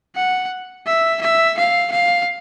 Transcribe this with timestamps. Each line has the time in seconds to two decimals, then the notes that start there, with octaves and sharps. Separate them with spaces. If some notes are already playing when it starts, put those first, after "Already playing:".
0.15 F#5
0.87 E5
1.21 E5
1.58 F5
1.92 F5